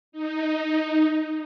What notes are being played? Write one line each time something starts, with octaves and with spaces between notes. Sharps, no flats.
D#4